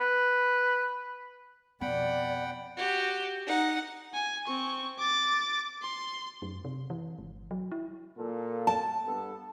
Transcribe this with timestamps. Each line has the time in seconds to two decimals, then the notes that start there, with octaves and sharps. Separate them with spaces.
0.01 B4
1.81 F2 B2 B3 D5 F#5 G5 B5
2.77 F#4 G4
3.46 D#4 F#5
4.14 G#5
4.47 C4 C#6
4.99 D6 A6
5.82 C6
6.42 F#2
6.65 C3
6.90 E3
7.19 G1
7.51 F#3
7.72 E4
8.18 A#2 F4 A4
8.67 A5
9.06 G2 B3 A4